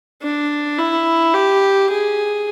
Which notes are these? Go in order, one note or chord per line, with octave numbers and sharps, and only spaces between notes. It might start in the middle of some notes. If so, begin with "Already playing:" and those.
D4
E4
G4
G#4